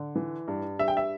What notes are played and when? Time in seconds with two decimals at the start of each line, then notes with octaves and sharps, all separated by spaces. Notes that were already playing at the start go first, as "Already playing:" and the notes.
Already playing: D3
0.15 E3
0.48 G2
0.79 G2 E5
0.88 G5
0.97 E5